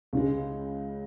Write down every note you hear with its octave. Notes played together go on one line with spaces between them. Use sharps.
C#2 C#3 G#3